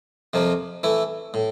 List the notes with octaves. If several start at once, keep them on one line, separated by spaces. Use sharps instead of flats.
F2 C3 F3 A#3
E3 A3 E4
A2